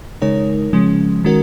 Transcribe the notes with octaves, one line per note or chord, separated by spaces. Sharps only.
C#3 G#3 D#4 A#4 C#5
C#3 F3 G#3 C#4
D#3 G#3 C#4 F#4 A#4